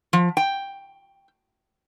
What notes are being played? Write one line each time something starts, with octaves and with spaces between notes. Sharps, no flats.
F3
G5